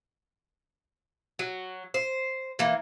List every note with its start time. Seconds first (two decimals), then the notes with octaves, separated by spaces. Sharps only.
1.39 F#3
1.94 C5
2.59 E3 A#3